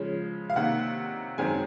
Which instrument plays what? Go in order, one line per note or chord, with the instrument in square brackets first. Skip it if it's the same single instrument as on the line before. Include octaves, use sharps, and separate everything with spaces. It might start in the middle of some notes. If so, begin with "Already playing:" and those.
Already playing: [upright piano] C#3 F3 G#3 C#4
F5
C3 D#3 A#3 F#5
F#2 D#3 G#3 C4 G#5